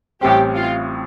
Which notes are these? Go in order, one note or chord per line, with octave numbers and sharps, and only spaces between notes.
A1 A2 G3 C4 G4
F4